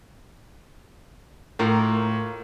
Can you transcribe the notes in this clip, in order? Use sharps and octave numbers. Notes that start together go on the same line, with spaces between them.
A2 A#3 F4 A#4